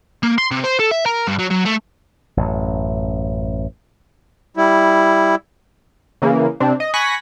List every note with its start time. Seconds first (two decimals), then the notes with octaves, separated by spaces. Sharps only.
0.23 A#3
0.38 C6
0.51 C3
0.64 C5
0.79 A4
0.91 E5
1.06 A#4
1.28 G2
1.39 F#3
1.51 F#3
1.66 A3
2.37 A1 F#2
4.57 G3 E4
6.22 C#3 E3 A#3
6.60 C3 C4 D4
6.80 D#5
6.94 G#5 B5 C#6 F#6 A#6 B6